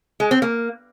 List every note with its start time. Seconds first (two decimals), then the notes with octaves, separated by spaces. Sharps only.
0.20 G#3
0.31 C4
0.42 A#3